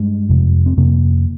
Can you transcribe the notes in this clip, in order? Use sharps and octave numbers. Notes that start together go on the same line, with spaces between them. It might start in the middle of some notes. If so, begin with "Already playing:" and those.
Already playing: G2 G#3
F2 C3
C4
F2 C3 A#3